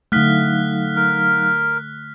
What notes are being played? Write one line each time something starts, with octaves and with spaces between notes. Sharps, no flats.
D3 F#3 A3 D#4 F5 F6 F#6 B6
A#4